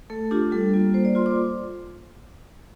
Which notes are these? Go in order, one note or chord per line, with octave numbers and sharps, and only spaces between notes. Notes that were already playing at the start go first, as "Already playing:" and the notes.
A3 A4
D4 F4 G4
G3 A4
A#3 F4
A#3 C5
D5
F4 C6
D6